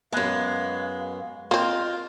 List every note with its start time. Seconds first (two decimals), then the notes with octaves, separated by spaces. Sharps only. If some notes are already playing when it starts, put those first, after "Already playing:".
0.12 F#2 G#3 B3 F5
1.51 A#3 C4 F4 D#5